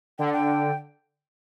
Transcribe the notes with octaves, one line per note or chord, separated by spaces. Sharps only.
D3 G5
F#5
G5